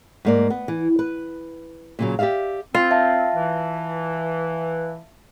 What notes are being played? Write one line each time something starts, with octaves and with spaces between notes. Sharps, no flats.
G#2 A#3 D5
B3
E3
B4
A#2 C#3 F#3
G4 A4 D5 E5 F5
C4 F4
E5 F5 A5
E3